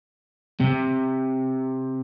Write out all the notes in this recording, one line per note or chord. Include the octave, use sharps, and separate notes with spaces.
C3